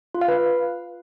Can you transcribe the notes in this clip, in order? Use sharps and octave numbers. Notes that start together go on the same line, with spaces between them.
F4
F5
B4